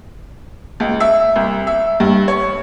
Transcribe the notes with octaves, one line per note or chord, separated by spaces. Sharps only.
C#2
E5
C2
E5
G2
C#5